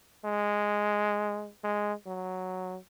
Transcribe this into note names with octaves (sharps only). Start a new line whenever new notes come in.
G#3
G#3
F#3